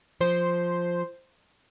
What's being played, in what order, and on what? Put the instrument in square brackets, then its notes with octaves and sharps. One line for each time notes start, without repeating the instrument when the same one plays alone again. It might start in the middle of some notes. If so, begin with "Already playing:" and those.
[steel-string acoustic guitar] F3 [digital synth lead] C5